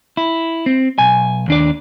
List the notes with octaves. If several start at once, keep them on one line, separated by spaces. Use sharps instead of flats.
E4
C4
B1 G#5
D#2 D4 D5